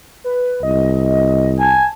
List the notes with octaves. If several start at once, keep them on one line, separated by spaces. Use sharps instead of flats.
B4
C2 D#5
G#5 A5